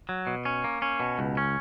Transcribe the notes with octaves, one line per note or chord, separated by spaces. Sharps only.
F#3
B2
C#4
A#3
C#4
B2
C#2
C#4